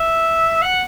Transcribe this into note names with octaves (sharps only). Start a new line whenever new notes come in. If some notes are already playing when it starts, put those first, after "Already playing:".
Already playing: E5
F#5